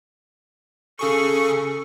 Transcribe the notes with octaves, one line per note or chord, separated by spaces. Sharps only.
C#3 G#4 A4 C#6